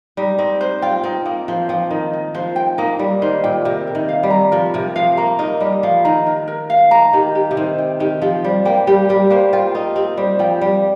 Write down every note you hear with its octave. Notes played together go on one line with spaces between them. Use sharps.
G3 D#4
C4 D#4
C5
F4 G5
C4 D#4
A#3 D#4
F3 C5
F3 G5
D#3 D#4
D#4
F3 C5
G5
A#3 D#4
G3 D#4
D#3 C5
A#2 G5
C3 A#4
A#4
D#3
F5
G3
A#5
F3 A#4
C3 A#4
F3 F5
A#3 A#5
D#4 A#4
G3 A#4
F3 F5
D#3 A#5
A#4
A#4
F5
A#5
D#3 G4
G4
C3
D#3 C5
G5
D#3 G4
F3 G4
G3 C5
A#3 G5
G3 G4
G3 G4
A#3 C5
F4 G5
D#4 G4
C4 G4
G3 C5
F3 G5
G3 G4